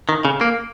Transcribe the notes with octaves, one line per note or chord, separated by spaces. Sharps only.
D#3
C#3
A#3